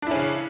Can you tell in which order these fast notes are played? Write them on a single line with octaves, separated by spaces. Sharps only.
D4 E4 C#4 C#3